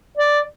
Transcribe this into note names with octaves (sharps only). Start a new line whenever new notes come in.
D5